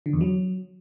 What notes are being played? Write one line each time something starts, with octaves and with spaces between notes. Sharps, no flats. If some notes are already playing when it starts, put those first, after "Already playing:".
D3
E2
F#3